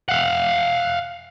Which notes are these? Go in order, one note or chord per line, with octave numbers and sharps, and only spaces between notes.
F5 F#5